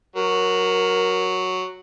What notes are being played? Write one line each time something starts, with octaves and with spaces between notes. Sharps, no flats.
F#3 A#4